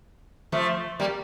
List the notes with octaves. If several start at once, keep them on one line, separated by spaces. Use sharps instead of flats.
F3 A3
G3 A#3